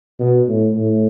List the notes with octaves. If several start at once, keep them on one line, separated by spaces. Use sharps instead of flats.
B2
A2
A2